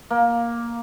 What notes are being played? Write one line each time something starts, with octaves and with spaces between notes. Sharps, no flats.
A#3